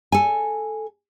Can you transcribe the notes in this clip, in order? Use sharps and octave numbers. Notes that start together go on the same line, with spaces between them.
A4 G#5